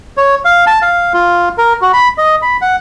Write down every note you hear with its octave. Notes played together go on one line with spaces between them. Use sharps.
C#5
F5
A5
F5
F4
A#4
F#4
B5
D#5
B5
F#5